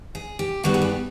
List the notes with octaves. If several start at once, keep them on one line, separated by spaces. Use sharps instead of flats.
G#4
G4
G2 D#3 G3 B3 D4 F#4
G#4
G4